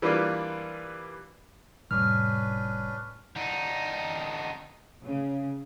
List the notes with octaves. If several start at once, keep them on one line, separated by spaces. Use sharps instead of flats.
E3 G3 A#3 D4 F4 B4
F1 A2 G3 C#4 D4 B4 F6
D3 D#4
C#3